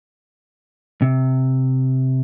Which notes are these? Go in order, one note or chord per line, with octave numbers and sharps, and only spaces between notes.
C3